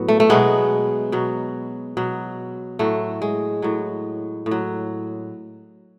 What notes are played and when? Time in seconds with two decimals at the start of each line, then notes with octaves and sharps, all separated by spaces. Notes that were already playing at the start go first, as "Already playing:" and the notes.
Already playing: A2 F#3 B3
0.08 A3
0.20 A3
0.29 B2 F#3 G#3 B3
1.12 B2 F#3
1.97 B2 F#3
2.79 A2 F#3 A3
3.22 G#3
3.62 A2 F#3
4.46 A2
4.51 F#3